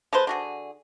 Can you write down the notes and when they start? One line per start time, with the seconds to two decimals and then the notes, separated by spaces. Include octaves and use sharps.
0.13 G#3 A4 B4 C5
0.27 D3 F#4 G#4